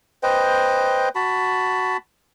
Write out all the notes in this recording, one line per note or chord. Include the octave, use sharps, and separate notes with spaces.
B4 C5 D#5 G5
F#4 A5 B5